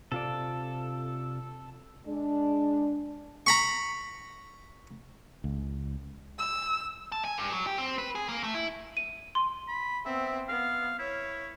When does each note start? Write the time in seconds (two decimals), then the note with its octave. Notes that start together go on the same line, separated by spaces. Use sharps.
0.12 C3 F4 A4 D5
2.07 G#3 D4
3.46 A#5 B5 C#6
5.44 C#2
6.39 E6
7.12 A5
7.25 G#5
7.38 G2
7.53 F#3
7.67 G4
7.78 C4
7.98 B4
8.15 G#4
8.29 A#3
8.43 A3
8.55 E4
8.97 D#7
9.35 C6
9.68 B5
10.06 B3 C4 E5
10.49 B3 F5
10.99 E4 C#5